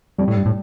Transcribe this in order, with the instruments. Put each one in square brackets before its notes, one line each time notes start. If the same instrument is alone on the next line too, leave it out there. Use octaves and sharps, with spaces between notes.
[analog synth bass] F2 [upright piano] G3
[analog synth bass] A2
G2
A2